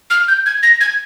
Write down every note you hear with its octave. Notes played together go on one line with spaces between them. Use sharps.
F6
G6
G#6
A#6
G#6